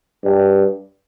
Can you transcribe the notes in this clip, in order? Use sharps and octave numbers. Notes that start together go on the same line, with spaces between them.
G2